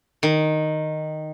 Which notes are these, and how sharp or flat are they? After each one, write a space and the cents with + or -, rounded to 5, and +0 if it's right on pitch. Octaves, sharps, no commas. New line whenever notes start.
D#3 -5